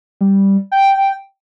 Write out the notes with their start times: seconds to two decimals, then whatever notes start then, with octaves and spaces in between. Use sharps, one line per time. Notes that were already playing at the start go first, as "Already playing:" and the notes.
0.21 G3
0.72 G5